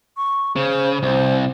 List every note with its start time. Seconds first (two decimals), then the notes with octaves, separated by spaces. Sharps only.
0.17 C#6
0.56 C#3 C5
1.03 C2 C5